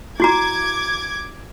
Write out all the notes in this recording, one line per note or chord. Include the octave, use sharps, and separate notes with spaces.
E4 F#4 A#5 D6 G#6